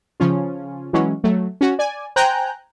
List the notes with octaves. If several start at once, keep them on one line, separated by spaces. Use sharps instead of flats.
C#3 F3 C#4 F4
E3 F#3 G#3 C#4
F#3 A3
C#4 F#4
D5 G#5
C5 G5 G#5 A#5 F#6 G6